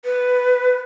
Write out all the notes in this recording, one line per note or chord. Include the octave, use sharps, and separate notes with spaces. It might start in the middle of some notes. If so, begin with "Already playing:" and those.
B4